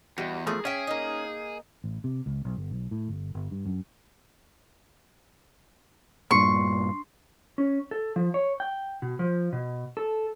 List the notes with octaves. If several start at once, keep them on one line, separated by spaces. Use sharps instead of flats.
E2 G3 F#4 D#5
F3 A3 A#3 G#4
C#4 G#4 E5 G5
A#3 D#4
A1
C3
C#2
B1
G1
B1
A2
G1
G1
G2
F#2
G2 A#2 D4 C6 C#6 C7
C#4
A4
F3
C#5
G5
B2
F3
B2
A4